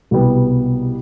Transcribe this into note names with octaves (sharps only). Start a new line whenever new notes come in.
C2 B2 G3 B3